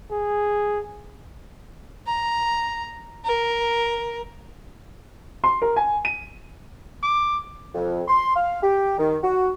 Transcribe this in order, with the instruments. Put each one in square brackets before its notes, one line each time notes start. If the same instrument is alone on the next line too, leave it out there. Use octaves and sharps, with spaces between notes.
[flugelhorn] G#4
[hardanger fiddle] A#5
A#4
[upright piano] C6
A#4
G#5
D#7
[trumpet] D6
[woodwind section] F2
C6
F5
G4
D#3
F#4